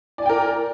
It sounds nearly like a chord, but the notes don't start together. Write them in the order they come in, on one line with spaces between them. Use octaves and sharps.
D5 G#5 G5 A#4